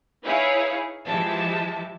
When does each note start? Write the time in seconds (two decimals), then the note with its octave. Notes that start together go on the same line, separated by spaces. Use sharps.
0.24 D#4 E4 G#4 B4 C#5 F5
1.06 E3 F3 G#3 G4 E5 A5